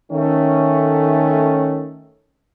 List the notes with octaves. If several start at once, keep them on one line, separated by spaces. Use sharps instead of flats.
D#3 A3 C#4